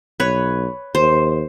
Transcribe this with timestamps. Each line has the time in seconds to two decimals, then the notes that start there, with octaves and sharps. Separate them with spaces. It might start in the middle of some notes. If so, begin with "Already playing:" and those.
0.20 B1 B4 C#5
0.95 D#2 C5